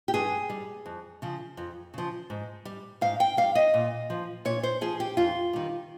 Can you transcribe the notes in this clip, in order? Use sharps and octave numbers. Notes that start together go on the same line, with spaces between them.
G4
G2 G#4
G3
F2
C#3 F3
F2
C#3 F3
G#2
G3
G#2 F5
G5
G3 F5
D#5
A#2
F3
A#2 C#5
C5
F3 G#4
G4
F2 F4
D#3 G3